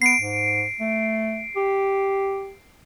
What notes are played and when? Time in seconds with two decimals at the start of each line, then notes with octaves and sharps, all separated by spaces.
0.02 B3 C7 D7
0.20 G#2
0.81 A3
1.56 G4